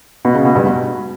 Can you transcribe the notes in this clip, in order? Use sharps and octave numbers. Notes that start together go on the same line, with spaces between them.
B2
C#3
B2
G2
B2